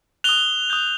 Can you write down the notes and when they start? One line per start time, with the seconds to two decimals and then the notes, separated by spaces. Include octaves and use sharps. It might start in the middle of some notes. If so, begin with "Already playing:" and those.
0.24 D#6 F#6 F7 G7
0.70 D#6 G6